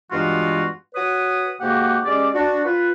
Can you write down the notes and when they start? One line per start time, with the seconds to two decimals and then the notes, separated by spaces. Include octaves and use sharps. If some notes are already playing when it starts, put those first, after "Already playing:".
0.12 G2 E3 G#3 B3 F4 F#4
0.95 F#4 B4 C#5 D#6
1.61 G#2 C#3 A#3 F#4 G4 F#5
2.05 G#3 C#4 G4 D5
2.35 D4 F#4
2.65 F4 B4